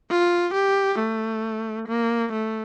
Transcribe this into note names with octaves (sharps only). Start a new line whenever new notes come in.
F4
G4
A3
A#3
A3